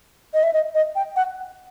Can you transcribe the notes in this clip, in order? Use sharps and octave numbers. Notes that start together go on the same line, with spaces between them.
D#5
E5
D#5
D#5
G5
F#5